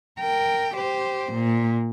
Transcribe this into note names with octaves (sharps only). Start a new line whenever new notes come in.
A#4 G5
G4 C5
A#2